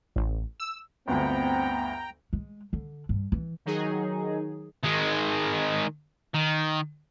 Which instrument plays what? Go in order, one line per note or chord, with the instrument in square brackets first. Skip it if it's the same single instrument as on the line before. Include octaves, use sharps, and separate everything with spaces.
[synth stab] A1
E6
[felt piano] G1 D2 [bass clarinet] B3 [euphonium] C4 [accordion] G5 A#5
[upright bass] G#3
D3
G2
E3
[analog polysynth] D#3 F#3 D#4 G#4
[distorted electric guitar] D#3 G#3
D#3